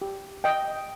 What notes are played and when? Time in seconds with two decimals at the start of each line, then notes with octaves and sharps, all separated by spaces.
0.02 G4
0.44 D#5 G5